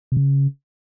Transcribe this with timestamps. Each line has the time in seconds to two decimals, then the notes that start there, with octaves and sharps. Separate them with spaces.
0.12 C3
0.17 C#3